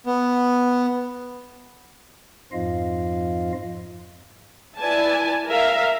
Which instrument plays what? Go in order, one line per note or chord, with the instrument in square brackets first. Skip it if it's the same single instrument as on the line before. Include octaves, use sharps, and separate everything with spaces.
[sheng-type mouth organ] B3
[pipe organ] F2 G#2 F3 F4 D#5 F5
[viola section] E4 B4 D5 G#5 A5
A#4 E5 F5